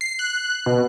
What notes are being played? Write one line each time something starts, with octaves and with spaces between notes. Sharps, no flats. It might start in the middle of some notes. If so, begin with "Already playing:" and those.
C7
F#6
B2